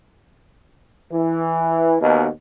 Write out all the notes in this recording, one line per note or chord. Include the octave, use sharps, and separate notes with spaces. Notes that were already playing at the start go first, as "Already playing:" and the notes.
E3
D#2 B2